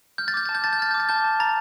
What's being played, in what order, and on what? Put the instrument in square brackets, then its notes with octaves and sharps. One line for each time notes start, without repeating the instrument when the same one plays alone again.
[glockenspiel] F6 G6
A6
D6 G6
A5 A6
G6
A5 A6
G6
F6 A6
D6 G6
A6
A5 G6
A5
A#5 A6